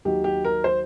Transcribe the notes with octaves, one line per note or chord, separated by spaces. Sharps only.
D#2 D#3 F#3 G4
G4
A#4
C5